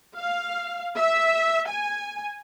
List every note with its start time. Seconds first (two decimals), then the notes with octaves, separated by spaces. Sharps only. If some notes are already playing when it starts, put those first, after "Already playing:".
0.18 F5
0.96 E5
1.68 G#5